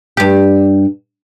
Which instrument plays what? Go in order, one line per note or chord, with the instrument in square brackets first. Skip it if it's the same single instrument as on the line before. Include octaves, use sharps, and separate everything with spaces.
[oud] G2 G4